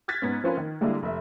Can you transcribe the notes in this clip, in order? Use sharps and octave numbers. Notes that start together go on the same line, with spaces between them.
F6 F#6 G#6 A6 B6
G#2 B3 C#4
F3 C4 C#4 F4 A#4 B4
D#3
D3 G3 G#3 A#3 D4 E4
F1 E5